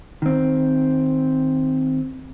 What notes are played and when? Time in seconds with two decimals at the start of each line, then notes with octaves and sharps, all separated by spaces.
0.22 D#3 C4